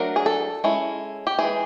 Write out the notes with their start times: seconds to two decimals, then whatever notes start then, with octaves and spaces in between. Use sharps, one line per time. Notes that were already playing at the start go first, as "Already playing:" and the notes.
Already playing: F#3 A3 D4 A#4
0.16 G#4
0.26 A4
0.64 G#3 C#4 E4
1.27 G4
1.39 E3 G#3 C4 E4 G#4